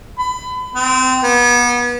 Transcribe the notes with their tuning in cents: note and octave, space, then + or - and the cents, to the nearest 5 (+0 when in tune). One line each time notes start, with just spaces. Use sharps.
B5 +30
C4 -25
B3 -30